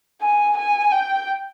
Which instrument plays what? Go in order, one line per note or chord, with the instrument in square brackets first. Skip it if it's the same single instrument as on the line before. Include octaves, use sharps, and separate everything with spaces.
[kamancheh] G#5
G#5
G5